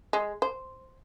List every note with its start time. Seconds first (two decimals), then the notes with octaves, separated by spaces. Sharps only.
0.13 G#3
0.42 C5